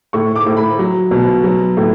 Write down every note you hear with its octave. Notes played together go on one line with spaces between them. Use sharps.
A2 C#6
D6
A2
B5
F#3
B2
F#3
A2